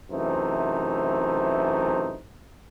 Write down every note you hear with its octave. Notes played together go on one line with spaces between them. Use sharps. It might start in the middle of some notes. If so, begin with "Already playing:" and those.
F#2 C3 E3 A3 D#4 C5